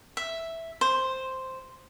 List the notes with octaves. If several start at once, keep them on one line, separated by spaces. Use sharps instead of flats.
E5
C5